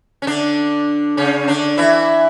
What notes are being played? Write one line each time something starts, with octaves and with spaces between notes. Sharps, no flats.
C#4
D3 D4
C#3 C#4
D3 D4
E3 E4